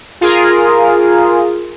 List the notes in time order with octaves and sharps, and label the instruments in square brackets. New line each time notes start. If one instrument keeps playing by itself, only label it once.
[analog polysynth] F4 G#4 A#4